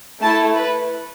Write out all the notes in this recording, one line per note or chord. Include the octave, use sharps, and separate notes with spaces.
A3 E4 A4 A5
B4